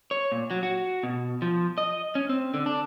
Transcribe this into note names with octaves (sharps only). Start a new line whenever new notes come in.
C#5
A#2
F#3
F#4
B2
F3
D#5
C#4
C4
D3
D4